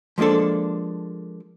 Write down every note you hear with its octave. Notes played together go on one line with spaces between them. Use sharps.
F3 G#3 A#3 D4 A4